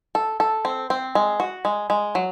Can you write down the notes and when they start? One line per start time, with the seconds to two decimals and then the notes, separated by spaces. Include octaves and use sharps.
0.15 A4
0.40 A4
0.65 C4
0.90 C4
1.15 G#3
1.40 F#4
1.65 G#3
1.90 G#3
2.15 F#3